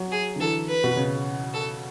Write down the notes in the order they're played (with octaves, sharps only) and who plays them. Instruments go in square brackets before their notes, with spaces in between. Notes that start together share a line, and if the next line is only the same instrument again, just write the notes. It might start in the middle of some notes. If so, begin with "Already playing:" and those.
Already playing: [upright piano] F#3
[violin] G#4
[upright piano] D3
[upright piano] E3 [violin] A4
[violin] B4
[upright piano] B2
C#3
[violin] A4